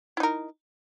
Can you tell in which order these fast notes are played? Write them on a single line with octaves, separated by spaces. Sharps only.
E4 D#4 A#4